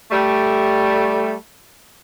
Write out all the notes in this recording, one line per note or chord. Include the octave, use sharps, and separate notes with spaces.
G3 A3